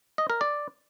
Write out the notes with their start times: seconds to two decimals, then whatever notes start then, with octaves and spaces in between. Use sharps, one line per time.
0.18 D#5
0.30 A#4
0.41 D5